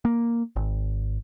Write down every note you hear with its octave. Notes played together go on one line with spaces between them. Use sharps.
A#3
G#1